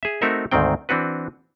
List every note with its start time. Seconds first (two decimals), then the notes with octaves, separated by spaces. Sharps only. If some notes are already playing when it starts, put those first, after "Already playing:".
0.03 G#4 E5
0.22 A3 C4 D#4 F#4 A#4 E5
0.51 D2 G#2 D#3 C4 G5
0.89 E3 C4 D4 F#4 B4